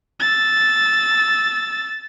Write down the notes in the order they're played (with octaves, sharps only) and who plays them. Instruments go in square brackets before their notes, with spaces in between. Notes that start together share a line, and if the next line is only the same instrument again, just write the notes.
[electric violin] E6 A6